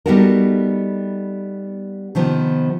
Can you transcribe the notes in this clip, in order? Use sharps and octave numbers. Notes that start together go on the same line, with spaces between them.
G3 B3 D#4 F#4 A4 A#4
C3 D#3 F3 B3